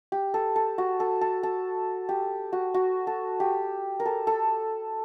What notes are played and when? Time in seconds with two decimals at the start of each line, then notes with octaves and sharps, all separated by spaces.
0.12 G4
0.34 A4
0.56 A4
0.78 F#4
1.00 A4
1.21 A4
1.43 A4
2.09 G4
2.53 F#4
2.74 F#4
3.07 A4
3.40 G4
4.00 A#4
4.05 A4
4.27 A4